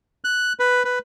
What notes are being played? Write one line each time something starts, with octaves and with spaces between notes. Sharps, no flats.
F#6
B4
B4